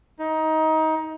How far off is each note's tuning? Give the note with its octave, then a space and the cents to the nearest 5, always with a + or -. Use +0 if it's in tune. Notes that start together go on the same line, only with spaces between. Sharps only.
D#4 +20